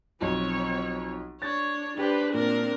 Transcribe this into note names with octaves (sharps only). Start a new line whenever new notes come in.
B1 F3 C4 C#5
D4 C#5 A6
D4 G4 B4 C5 G5
A#2 C4 D4 A#4